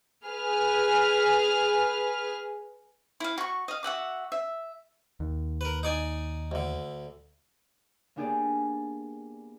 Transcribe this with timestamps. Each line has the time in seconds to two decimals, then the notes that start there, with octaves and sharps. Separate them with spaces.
0.27 G#4 B4 F6
3.20 E4 F5
3.38 F#4 C#6
3.68 D#5 F5
3.83 F#4 E5 F#5 D6
4.32 E5
5.20 D#2
5.61 A#4 B4
5.83 D#4 D5 G#5
6.52 D2 D3
8.16 A#3 B3 D4 G4 G#4 D5